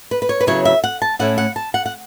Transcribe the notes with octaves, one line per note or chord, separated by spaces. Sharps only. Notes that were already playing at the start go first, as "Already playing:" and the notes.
B4
B4
C#5
B4
C#3 F#3 B3 E4 C#5
E5
F#5
A5
A2 A3 C#4 E4 F#5
F#5
A5
F#5
F#5